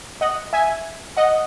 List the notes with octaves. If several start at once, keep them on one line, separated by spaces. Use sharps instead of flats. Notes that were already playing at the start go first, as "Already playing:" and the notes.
D#5 F#5
E5 G#5
D#5 F#5